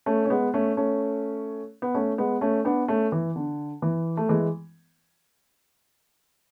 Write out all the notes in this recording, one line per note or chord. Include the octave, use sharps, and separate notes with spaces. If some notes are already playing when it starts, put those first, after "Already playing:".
A3 C#4
C#4
G#3 B3
A3 C#4
A3 C#4
B3
A3 C#4
G#3 B3
A3 C#4
B3 D4
A3 C#4
E3
D3
E3
A3
E3 G#3